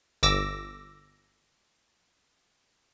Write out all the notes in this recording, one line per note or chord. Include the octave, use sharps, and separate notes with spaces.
G1 D6 E6 A#6